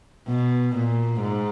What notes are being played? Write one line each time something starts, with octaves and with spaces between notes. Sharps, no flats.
B2
A#2
G#2